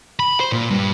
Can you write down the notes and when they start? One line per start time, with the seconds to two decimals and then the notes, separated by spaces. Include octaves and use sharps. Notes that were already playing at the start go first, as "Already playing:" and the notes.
0.19 B5
0.40 C5
0.52 A#2
0.70 G2